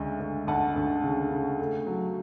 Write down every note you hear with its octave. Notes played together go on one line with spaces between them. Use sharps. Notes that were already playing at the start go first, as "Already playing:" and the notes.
Already playing: D2 C#3 G#3 E5
D2
D2 F#5 A5
D2
C#3
C#3
A3
F#3